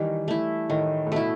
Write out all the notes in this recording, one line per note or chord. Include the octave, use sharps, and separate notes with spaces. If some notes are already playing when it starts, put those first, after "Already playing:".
Already playing: D#3 E3 G3
A3 E4
A2 D#3
A2
B2 A3 E4